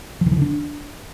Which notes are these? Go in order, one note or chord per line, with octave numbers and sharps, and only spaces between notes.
F3
D#3
E3
D3
D4